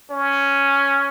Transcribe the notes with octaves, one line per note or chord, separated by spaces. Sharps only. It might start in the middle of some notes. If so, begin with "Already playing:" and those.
C#4